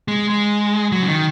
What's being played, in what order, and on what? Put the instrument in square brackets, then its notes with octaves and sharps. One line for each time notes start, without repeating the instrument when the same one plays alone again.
[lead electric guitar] G#3
G#3
F#3
C#3
D#3